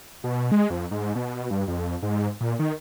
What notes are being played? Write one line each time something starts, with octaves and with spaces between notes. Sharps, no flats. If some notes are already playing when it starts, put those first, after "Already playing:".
B2
G#3
F2
G#2
B2
G2
F2
G#2
A#2
D#3